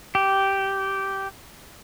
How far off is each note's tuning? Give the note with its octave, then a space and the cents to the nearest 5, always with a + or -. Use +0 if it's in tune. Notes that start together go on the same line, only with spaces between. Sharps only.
G4 -10